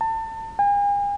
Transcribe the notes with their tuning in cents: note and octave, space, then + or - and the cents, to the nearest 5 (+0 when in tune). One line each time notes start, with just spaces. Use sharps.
A5 +30
G#5 -45